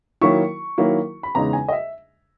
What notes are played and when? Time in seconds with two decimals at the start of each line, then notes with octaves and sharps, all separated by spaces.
0.21 D#3 F#3 A#3 E4 C#6
0.78 D#3 F#3 A#3 E4
1.23 B5
1.35 E2 C#3 G#3 D#4 A#5
1.53 G#5
1.68 D#5
1.72 E5